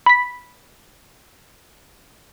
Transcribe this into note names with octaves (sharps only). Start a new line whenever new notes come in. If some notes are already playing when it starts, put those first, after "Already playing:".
B5 B6